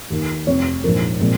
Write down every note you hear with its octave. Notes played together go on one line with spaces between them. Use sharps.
D#2 D#3 A#3
F1 F2 C3 G3 C4 C#5
A#1 G#2 F3 A#4
A#2 F3 G#3 C4